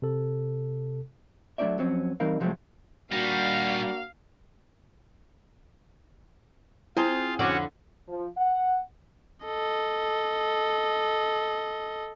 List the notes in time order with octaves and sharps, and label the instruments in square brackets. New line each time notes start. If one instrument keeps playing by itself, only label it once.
[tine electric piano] C3 A4
[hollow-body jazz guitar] F#3 A3 D4 D#4 D5 E5
F2 F#3 C4 C#4
E3 G3 C4 D#4 A#4 F5
C3 F3 F#3 G#3 A3 C4
[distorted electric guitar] A#2 D#4 [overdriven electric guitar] G3 [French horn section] A#3 D4 F#4 [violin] F5
[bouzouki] C4 G#4 C5 [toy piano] E4 [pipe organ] F4
[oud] F2 D3 D5 [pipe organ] C#4 F#4
[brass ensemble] F3
F#5
[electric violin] A4 D#5